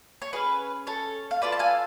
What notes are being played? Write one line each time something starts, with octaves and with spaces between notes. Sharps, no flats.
C#5
C#4 G#4 B4
A4 C#5
F5
B3 F4 A4 B4 D5
A5
F5 G#5